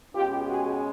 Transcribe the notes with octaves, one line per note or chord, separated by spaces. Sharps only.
B2 G#3 C#4 F4 G4
F#4 G#4